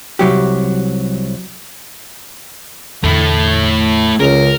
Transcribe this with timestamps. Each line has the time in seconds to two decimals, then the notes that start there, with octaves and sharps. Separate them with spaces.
0.19 C2 F#3 G4
3.04 E2 D3 A3 E4
4.20 C#2 C#3 A#4